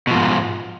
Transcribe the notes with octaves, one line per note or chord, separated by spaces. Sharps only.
G#2 B2 F3